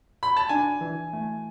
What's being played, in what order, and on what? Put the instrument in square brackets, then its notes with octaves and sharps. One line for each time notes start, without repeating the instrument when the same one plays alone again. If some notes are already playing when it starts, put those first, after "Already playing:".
[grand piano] B5
A5
[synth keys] D4 [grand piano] G#5
[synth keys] E3
A3